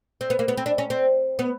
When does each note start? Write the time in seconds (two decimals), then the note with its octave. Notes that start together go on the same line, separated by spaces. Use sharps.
0.21 C4
0.30 B3
0.39 A#3
0.48 B3
0.57 C4
0.66 D4
0.78 C#4
0.90 C4
1.39 B3